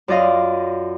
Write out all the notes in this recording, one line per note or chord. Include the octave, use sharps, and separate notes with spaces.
F#2 F4 D5 D#5 F5